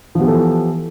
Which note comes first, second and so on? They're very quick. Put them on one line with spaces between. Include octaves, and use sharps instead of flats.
F3 B3 G4 E3 A4